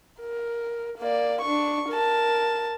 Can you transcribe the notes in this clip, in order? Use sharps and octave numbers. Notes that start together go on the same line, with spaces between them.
A#4
A#3 D5
D4 C#6
A#4 A5